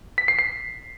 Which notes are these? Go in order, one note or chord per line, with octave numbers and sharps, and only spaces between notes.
B6
C7
C7